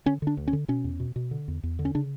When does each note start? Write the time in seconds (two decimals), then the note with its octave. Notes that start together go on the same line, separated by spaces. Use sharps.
0.06 D3 C#4
0.22 D3 D4
0.37 D2
0.48 C#4
0.53 D3
0.68 B2 C#4
0.84 E2
1.00 B2
1.16 B2
1.31 D3
1.48 E2
1.63 E2
1.79 D3
1.85 C#4
1.95 C#3 D4